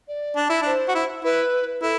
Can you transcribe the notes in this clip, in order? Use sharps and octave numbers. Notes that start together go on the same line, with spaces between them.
D5
D4
E4
D4 C5
F#4
E4
E4 B4
E4 A4